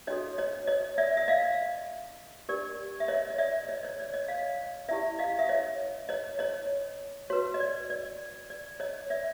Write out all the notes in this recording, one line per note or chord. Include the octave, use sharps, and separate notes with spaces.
D4 F#4 A4 C#5 D#5
C#5 D#5
C#5 D#5
D5 E5
E5
D#5 F5
D4 G4 A#4 D5
E5
C#5 D#5
D#5
D5 E5
C#5 D#5
C#5 D#5
D5
C#5 D#5
D#5 F5
C#4 E4 G4 D5 E5
D#5 F5
E5
C#5 D#5
C#5 D#5
C#5 D#5
F#4 B4 C#5
D#5
D5
D5
D5
C#5 D#5
D5 E5